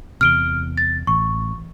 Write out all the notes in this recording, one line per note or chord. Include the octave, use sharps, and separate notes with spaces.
E2 C3 F6 D7 G7
A6
A1 C#6